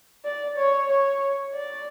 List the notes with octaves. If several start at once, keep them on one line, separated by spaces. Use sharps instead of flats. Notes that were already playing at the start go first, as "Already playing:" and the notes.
D5
C#5
C#5
D5